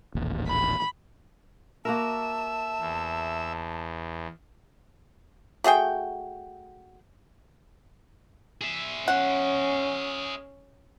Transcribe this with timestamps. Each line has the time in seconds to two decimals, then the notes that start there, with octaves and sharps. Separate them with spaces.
0.15 D#1 A1 D#2
0.48 B5
1.85 A#3 F#4 A#4 E5 A5
2.81 E2
5.64 A3 F#4 G#4 G5
8.61 G#4 E5
9.08 C#4 F#5